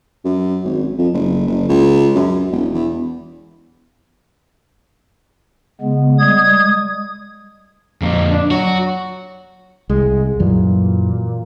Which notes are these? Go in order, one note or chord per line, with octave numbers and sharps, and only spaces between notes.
F#2
G#1
F2
F#1
F#1
C#2
F#2
E1
E2
C#3 G#3 B3
G3 G#3 D#6 G#6
F2 A#2
D4
F#3 F#4
C2 G#3
F#2 A#2 E3 F#3